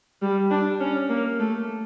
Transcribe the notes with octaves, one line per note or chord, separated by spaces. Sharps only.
G3
D4
C#4
A#3
A3